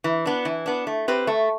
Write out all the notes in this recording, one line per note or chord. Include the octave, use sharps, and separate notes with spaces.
E3
B3 D4
E3
B3 D4
A3
C4 G4 B4
A3